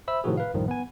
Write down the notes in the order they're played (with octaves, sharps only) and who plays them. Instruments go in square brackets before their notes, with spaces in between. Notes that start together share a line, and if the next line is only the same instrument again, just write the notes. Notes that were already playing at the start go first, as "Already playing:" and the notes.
[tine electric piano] C5 E5 B5 E6
A2 C3 D#3 F3 F#4 G#4
B4 F5
A#1 F#2 A2 D#3 F3 G3
B3 G#5